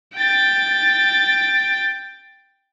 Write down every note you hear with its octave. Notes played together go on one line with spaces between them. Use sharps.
G5 A6